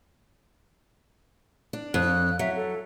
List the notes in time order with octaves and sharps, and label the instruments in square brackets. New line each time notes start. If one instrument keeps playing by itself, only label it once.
[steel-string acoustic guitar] D4
[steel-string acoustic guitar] F2 [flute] F#6
[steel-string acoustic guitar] F#3 [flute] E5
[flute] A4